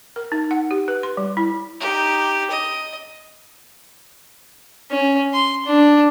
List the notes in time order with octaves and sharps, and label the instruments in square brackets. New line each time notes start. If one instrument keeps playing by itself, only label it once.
[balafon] A#4
D#4
F#5
G4
B4
C6
G3
E4
[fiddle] D#4 G4
D#5
[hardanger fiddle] C#4
C6
D4